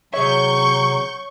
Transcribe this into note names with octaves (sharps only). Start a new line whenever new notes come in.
C3 F#3 G#4 C#5 E5 C#6 G6